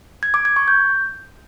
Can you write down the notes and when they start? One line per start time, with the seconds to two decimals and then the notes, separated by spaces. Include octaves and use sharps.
0.23 G#6
0.34 D6
0.45 G#6
0.56 C#6
0.68 G6